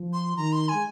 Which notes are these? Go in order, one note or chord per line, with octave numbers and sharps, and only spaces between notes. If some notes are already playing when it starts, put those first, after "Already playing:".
Already playing: F3
C6
D#3 A#5
C6
G#3 G#5